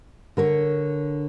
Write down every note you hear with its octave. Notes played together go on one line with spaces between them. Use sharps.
D3 A#4 C#5